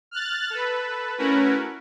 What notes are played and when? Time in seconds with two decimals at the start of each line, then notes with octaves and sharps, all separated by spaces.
0.11 F6 F#6 A6
0.50 A4 B4
1.18 A3 C#4 E4 F#4 A#4 B4